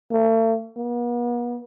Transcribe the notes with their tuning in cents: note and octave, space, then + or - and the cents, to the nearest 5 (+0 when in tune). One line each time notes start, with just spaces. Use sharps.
A3 +40
B3 -45